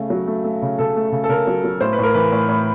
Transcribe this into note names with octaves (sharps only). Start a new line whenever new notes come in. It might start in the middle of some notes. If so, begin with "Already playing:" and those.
Already playing: C#3 A3
F#3
A3
A3
C#3
C#3 A4
A3
C#3
A4
C#3 A#4
F#3
F#3
A2 C5
B4
A2 A#4
E3 B4
A2
A2